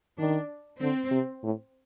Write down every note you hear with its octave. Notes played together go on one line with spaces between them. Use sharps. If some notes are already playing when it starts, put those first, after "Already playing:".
D#3 D4
D3 C4
C3
A2